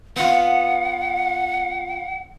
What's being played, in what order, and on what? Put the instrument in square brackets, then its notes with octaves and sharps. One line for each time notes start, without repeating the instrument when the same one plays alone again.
[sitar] B3 F4 [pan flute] F#5